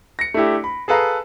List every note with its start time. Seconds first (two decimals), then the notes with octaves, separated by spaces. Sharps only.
0.19 A#6 C#7
0.34 A3 D4 E4 G4
0.64 B5
0.88 G#4 A4 B4 F5 A#5